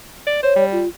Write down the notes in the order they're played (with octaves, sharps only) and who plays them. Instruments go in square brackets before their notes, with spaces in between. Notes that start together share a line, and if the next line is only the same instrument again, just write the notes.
[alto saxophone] D5
[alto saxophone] C5 [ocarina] C#5
[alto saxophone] G3
[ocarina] F4